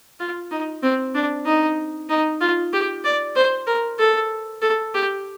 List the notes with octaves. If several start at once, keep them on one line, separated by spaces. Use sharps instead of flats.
F4
D#4
C4
D4
D#4
D#4
F4
G4
D5
C5
A#4
A4
A4
G4